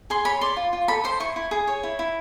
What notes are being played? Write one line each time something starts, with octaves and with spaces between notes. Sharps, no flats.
G#4 C6
C#5 B5
D5 C6
F4
F4
A4 B5
C5 C6
E4 C#6
E4
G#4
C#5
E4
E4